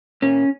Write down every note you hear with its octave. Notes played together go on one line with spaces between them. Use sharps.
A#2 C#4